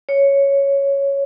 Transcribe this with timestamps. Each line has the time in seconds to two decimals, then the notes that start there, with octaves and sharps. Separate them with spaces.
0.09 C#5